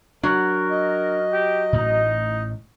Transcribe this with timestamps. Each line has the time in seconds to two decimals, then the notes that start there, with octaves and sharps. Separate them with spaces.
0.23 F#3 D4 A#4
0.70 D#5
1.33 G4
1.73 A1 A2 D#4